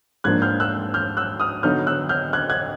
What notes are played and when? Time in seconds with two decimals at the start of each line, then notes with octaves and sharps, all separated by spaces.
0.24 G#2 F3 A#3 D4 F#6 G#6
0.42 F6 G6
0.60 E6 F#6
0.94 F6 G6
1.17 E6 F#6
1.40 D#6 F6
1.63 D3 F#3 B3 D#4 F6 G6
1.87 E6 F#6
2.09 F6 G6
2.33 F#6 G#6
2.50 F#6 G#6